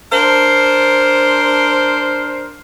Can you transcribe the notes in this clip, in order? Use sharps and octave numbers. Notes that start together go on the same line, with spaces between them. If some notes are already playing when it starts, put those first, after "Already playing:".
D4 A#4 C5